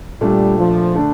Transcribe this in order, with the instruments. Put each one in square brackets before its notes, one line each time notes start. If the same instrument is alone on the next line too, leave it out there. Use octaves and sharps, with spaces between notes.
[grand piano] A#2 A3 D4 [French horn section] G3
[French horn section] F3
[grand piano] D3 A3 D4